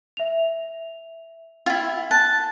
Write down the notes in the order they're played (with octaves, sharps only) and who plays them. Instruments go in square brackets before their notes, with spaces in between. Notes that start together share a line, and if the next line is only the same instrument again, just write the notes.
[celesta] E5 F7
[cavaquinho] E4 F4 [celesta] G5
[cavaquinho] A5 [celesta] F#6